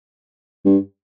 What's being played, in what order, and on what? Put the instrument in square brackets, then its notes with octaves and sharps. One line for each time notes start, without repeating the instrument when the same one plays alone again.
[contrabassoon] G2